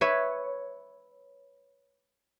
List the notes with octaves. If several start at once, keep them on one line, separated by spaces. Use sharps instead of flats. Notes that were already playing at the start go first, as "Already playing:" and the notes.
B4 C#5 E5